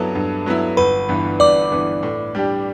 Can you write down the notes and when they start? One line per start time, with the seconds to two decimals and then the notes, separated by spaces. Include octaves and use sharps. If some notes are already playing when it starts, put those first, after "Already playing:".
Already playing: G2 F#3 B3 E4 A4 A5
0.15 G2
0.46 F#3 B3 E4
0.77 G1 B4 B5
1.09 G2 E3 B3
1.40 G1 D5 D6
1.71 G2 E3 B3
2.03 A2
2.35 G3 D4 G4